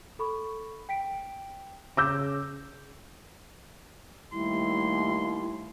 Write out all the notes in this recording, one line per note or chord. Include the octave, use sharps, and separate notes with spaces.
A4 B5 C#6
G5 B6 D7
C#3 D6 E6 G6 A#6
D#2 G3 A3 E4 C6